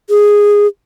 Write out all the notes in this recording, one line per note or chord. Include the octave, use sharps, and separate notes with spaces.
G#4